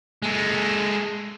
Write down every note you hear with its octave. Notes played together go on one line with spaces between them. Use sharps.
G#3 A4